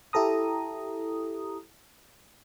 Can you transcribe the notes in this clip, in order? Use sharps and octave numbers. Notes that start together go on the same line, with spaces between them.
E4 G4 A4 A#5 D#6